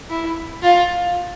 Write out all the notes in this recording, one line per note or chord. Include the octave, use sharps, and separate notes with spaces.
E4
F4